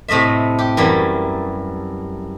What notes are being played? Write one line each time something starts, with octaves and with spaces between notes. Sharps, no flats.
A2 C3 A3 D#5 E5
G4
F#2 E3 F#3 G3